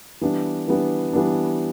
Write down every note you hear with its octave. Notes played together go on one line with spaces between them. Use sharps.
E3 G3 B3 D4
E3 G3 B3 D4
E3 G3 B3 D4